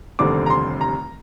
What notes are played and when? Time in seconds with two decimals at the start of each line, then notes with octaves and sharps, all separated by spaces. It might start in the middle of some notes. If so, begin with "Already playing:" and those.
0.19 F1 D#2 D3 G3 C4 D6
0.46 A#5
0.50 C6
0.81 A#5